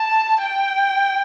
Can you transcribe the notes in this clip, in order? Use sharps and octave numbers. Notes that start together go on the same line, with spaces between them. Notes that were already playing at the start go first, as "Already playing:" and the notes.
Already playing: A5
G5